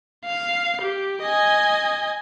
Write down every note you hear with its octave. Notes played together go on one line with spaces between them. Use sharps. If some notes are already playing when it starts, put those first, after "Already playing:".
F5
G4
D#5 G#5